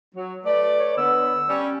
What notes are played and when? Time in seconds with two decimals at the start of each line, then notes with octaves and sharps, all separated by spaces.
0.15 F#3
0.45 A3 B4 D5
0.79 C#5
0.98 D3 B3 E6
1.49 G3 C#4